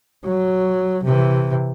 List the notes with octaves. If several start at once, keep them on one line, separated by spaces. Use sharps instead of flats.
F#3
C3 E3